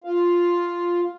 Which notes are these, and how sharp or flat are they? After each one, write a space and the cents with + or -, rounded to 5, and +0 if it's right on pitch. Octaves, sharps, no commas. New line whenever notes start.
F4 +0 F5 +0